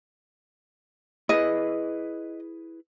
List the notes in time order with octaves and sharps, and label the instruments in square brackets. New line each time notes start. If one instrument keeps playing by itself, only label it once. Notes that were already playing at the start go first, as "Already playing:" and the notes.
[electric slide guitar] E4 G#4 B4 [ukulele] D#5